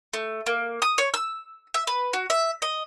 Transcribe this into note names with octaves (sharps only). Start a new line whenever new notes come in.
A3
A#3
D#6
C#5
E6
E5
B4
F#4
E5
D#5